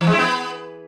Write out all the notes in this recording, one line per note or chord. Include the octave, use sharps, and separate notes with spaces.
E3
G#3
E4
B3